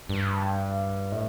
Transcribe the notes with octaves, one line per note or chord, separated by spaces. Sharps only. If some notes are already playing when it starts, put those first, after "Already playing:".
G2
A2